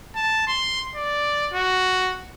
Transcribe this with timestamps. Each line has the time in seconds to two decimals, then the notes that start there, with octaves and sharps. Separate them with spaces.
0.15 A5
0.47 C6
0.95 D5
1.53 F#4